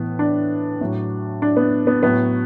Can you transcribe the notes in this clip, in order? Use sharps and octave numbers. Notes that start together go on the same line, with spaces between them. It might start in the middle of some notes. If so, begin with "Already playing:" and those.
Already playing: A2 E3 B3
D4
A2 F#3
D4
B3
B3
A2 F#3 B3